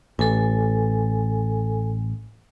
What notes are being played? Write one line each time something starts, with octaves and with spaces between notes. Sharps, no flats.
A1 A4 G#5